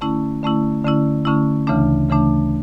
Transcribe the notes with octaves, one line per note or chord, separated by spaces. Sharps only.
D3 A3 C#4 E4
D3 A3 C#4 E4
D3 A3 C#4 E4
D3 A3 C#4 E4
D2 C#3 E3 A3 D4
D2 C#3 E3 A3 D4